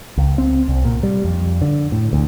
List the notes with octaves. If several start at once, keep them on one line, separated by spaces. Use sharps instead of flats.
C#2
C4
C2
A#2
G3
F2
D3
A2
D2